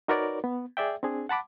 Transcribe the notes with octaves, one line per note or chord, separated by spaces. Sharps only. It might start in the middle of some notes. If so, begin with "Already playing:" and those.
D#4 F#4 A#4 B4 C#5 D5
B3
G#4 D5 E5 G5
C4 D4 G#4
F#5 A5 B5 D6